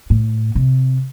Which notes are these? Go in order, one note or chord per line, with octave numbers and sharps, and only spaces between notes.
A2
C3